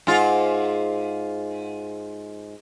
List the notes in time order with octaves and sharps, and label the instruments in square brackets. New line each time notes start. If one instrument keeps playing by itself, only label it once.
[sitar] G#2 F4